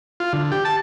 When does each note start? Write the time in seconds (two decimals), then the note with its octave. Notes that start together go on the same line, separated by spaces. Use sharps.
0.20 F4
0.33 D3
0.52 G4
0.65 A5